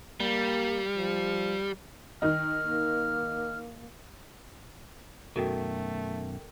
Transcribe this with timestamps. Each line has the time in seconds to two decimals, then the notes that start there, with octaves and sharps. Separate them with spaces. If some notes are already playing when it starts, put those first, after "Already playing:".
0.20 G3 A#3
0.96 F3
2.22 D#3 D#4 G5 F6
2.63 A#3
5.36 F#2 B2 D#3 A3 F#4 A4 A#4 G5